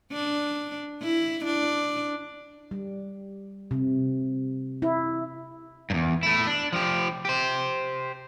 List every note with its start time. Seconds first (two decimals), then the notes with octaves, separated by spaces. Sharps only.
0.12 D4
1.03 E4
1.45 D4
2.71 G3
3.71 C3
4.82 E4
5.90 E2 G2
6.23 A3 E4
6.47 D4
6.73 F3 G4
7.25 G4 C5